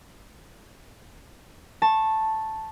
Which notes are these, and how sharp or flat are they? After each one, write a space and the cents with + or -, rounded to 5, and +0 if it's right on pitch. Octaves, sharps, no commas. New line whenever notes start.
A5 +0 C#6 -25